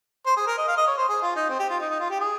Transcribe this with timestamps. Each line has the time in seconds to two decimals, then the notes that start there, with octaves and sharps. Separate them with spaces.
0.26 C5
0.37 G#4
0.47 A#4
0.58 D#5
0.68 F5
0.77 D#5
0.88 C#5
0.97 C5
1.09 G#4
1.22 F4
1.36 D#4
1.49 C4
1.59 G4
1.70 F4
1.80 D#4
1.91 D#4
2.00 F4
2.10 G4
2.20 G#4